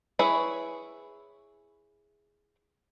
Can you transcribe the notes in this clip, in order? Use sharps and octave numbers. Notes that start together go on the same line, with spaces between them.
E4 G#4 B4 C#5 E5